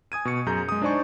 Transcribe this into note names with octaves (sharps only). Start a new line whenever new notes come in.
G#5 D#6 G#6 D#7
B2 C#6 C#7
F#2 G#4 A#5 G6
G#3 D#6
D4 D#4 C5 D5 G#5 C#6